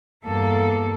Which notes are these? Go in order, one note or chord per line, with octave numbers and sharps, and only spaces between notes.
E2 G2 A#3 A4